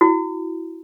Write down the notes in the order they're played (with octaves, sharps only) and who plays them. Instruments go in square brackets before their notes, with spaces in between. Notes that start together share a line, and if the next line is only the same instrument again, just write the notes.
[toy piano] E4 F#4